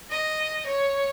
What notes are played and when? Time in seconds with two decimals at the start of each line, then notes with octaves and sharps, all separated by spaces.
0.11 D#5
0.67 C#5